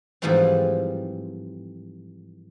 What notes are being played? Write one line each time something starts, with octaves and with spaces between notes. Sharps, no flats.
G#2 E3 F3 G3 A3 C4